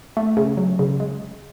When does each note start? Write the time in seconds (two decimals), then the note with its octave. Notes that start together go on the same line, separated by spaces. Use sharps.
0.17 A3
0.37 C#3
0.57 F#3
0.79 C#3
1.00 G#3